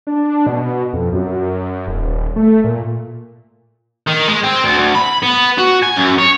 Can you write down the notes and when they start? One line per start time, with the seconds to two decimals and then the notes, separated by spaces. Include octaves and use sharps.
0.07 D4
0.47 B2
0.93 F2
1.12 F#2
1.88 D#1
2.36 A3
2.64 A#2
4.07 D#3
4.27 G#3
4.44 C4
4.64 D2
4.94 B5
5.23 B3
5.59 F#4
5.83 G#5
5.97 F#2
6.18 C#5